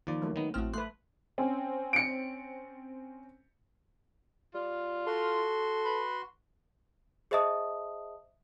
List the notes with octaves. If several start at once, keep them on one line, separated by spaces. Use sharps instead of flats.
D#2 F3 D5
F#3 A3 A#3
D#3 B3
A1 C4 F#4 F6
A3 B4 C6 F#6
C4 C#4
C#7 D7
G3 F4
F#4 A4 C6
B4
G#4 C5 D#5 E5 A5 D#6